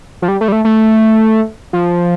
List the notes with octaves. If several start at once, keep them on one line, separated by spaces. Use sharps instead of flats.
F3
G3
A3
G3
A3
A3
F3